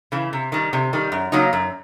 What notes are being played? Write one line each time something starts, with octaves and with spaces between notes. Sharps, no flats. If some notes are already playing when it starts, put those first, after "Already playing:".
C#3 E3
C3
D#3 G3
C3
D#3 G3
F#2
C#3 F#3 A#3 D#4
F#2